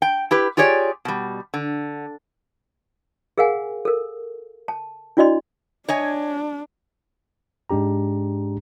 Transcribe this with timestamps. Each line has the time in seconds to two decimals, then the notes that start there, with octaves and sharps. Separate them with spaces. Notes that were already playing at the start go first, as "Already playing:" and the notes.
0.02 G5
0.31 E4 G4 B4
0.57 F4 G4 G#4 C#5 D5
1.05 B2 G3
1.54 D3
3.38 G#4 A#4 F5 F#5 G#5
3.85 A4 A#4
4.68 A5
5.17 D4 E4 F#4 D5 D#5 C6
5.89 D4 C#5 D#5 G#5
7.70 G#2 G#3 D4 G4 A#5